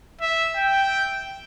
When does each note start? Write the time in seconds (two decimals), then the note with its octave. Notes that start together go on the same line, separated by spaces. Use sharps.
0.21 E5
0.56 G5